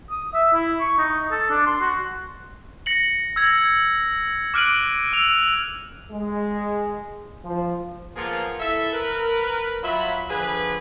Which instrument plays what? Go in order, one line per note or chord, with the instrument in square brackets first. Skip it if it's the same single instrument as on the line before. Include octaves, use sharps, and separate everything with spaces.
[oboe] D#6
E5
E4
C#6
D#4
A4
D4
C6
F#4
[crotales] A#6 C#7 F#7
E6 G#6 A#6
D6 F6 F#6 D7 D#7 F#7
E6 F7
[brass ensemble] G#3
F3
[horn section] F3 A#3 B3 F4 G#4 A#4
E4 A4 E5
A#4 B4
F#3 F4 E5 B5
D3 F3 G#4 B4